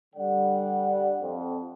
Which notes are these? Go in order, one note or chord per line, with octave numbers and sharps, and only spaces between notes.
G2 D3 G3 D5 F#5
F2